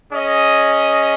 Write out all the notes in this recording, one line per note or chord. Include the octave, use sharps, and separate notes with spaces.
C#4 G#4 D#5